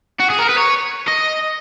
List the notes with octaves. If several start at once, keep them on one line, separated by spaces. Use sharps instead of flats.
F#4
G#4
A#4
B4
C#5
D#5